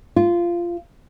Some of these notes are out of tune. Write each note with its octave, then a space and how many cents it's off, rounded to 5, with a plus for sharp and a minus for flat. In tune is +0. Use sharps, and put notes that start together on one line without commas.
F4 -15